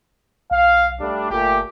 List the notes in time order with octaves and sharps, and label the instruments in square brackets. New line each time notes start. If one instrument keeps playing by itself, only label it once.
[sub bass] B1 [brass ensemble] F5
[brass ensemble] G3 A3 D4
[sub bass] G1 [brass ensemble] A#2 A3 G4